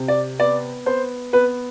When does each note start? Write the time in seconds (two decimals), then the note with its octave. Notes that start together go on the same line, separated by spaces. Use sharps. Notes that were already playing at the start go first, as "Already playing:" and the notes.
Already playing: C3
0.08 D5
0.39 B3 D5
0.86 B3 C5
1.33 B3 B4